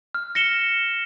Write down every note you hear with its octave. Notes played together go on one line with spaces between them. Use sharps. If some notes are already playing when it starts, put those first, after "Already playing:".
F6
A#6 C#7 E7 G7